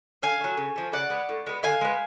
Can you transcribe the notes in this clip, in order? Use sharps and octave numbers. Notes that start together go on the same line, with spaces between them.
D3 F5 G#5
F#3 A3
C#3
F3 A3
C#3 D5 F#5
G#3 B3
A2
G#3 B3
D3 F5 G#5
G#3 B3